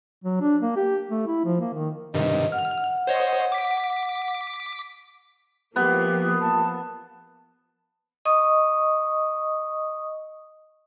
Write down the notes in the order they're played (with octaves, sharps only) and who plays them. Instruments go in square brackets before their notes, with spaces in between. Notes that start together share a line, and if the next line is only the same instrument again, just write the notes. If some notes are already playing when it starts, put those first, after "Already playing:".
[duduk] F#3
D4
A#3
G4
A3
E4
F3
A#3
D#3
[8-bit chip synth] G2 C3 D#3 [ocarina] D#5
[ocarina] F#5 [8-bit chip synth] F6
[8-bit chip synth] C5 C#5 D#5
D6 B6
[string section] F3 A#3 [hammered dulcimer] B3 [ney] G4
[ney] A5
[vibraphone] D#5 C#6 D#6